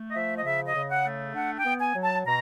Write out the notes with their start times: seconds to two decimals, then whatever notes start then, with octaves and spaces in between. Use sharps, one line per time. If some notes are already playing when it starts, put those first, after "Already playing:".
Already playing: A3
0.09 D#5
0.13 F3 E5
0.37 D#5
0.44 C#3 E5
0.67 D#5
0.74 C#3
0.90 F#5
1.05 A3
1.34 D4 F#5
1.58 G5
1.64 B3
1.80 G#5
1.95 F#3
2.02 A5
2.26 B2 A#5